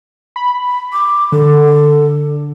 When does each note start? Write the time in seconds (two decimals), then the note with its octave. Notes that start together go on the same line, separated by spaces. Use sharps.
0.36 B5
0.93 D6
1.32 D3 A4